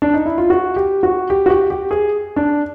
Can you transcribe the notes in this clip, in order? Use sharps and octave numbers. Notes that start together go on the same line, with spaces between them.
D4
D#4
E4
F4
F#4
G4
F#4
G4
F#4
G4
G4
G#4
D4